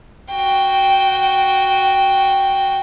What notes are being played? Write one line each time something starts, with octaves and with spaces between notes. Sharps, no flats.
F#4 G5